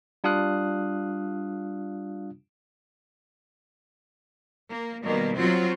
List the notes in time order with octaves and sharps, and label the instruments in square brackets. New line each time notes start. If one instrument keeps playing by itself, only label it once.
[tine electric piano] G3 D4 F4 F5 D#6 F#6
[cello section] A#3
B2 D#3 G3 A#3
F#3 C4 F4 F#4 C5